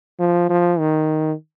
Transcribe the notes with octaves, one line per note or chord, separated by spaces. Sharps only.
F3
F3
D#3